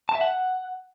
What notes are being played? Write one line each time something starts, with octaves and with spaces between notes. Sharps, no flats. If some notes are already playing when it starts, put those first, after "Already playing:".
A5
E5
F#5